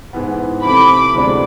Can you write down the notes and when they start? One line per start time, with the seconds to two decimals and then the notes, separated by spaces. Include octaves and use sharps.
0.13 G#2 E3 B3
0.63 C3 E3 A3 C4 B5 D6
1.14 D2 C3 G#3 B3 D4